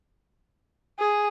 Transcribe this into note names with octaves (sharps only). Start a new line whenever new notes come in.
G#4